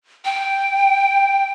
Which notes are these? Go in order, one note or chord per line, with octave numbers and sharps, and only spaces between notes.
G5